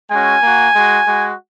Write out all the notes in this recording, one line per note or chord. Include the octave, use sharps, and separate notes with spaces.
G#3 C#4 F#4 G#5
A#3 F#4
G#3 F#4
G#3 F#4